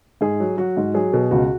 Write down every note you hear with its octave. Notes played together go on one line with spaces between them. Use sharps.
G#2 G#4
F#3
F#3 F#4
G#2
F#3 G#4
B2
C#2 F#4